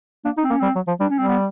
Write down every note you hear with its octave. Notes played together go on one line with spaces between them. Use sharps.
A#3 D4
D#4
C4
A#3 C#4
G3 C4
F#3
F3
G3 D4
C#4
G3 C4
B3